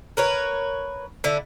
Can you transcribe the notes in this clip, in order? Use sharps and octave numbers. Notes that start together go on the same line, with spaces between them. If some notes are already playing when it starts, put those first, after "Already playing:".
A#4 B4 C#5
D3 E4